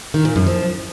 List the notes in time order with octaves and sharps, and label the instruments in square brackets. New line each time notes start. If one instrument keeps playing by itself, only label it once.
[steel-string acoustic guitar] D#3
A#2
F#2
F3